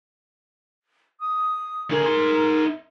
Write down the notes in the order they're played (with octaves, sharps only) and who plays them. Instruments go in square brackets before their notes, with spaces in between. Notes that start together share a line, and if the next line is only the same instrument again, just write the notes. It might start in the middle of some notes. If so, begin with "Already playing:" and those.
[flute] D#6
[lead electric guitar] D3 G#4 [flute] A#4
[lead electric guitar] D#4 C6